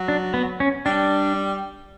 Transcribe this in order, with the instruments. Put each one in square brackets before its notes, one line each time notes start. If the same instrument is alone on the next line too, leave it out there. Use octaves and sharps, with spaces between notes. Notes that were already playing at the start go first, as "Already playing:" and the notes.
Already playing: [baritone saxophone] F#3
[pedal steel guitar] D4
B3
C#4
[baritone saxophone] G3 [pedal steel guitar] D4